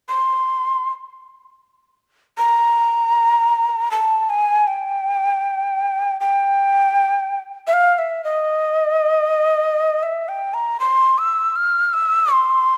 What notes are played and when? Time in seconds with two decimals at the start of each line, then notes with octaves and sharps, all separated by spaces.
0.09 C6
2.38 A#5
3.91 A5
4.29 G#5
4.67 G5
6.20 G5
7.67 E5
7.73 F5
7.98 E5
8.24 D#5
10.03 E5
10.28 G5
10.54 A#5
10.80 C6
11.18 E6
11.56 F6
11.94 E6
12.32 C6